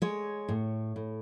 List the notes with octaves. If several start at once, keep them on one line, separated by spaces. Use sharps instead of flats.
G#3 C#5
A2
A2